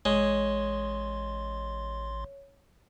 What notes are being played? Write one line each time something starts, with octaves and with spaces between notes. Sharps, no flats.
A1 G#3 C#5 C6